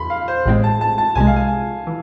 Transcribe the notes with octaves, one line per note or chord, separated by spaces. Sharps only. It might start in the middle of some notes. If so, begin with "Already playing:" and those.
Already playing: E2 B5 C6
F5
C5
A1 A2 G#3 C4
A5
A5
A5
C2 C3 G#3 G#5
F5
G#5
E3